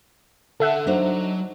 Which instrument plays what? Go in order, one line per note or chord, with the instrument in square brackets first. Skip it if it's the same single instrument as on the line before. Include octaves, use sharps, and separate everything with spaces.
[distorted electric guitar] D3 [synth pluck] A4 E5 F#5
[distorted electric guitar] F#3 [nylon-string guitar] D4 D#4 C5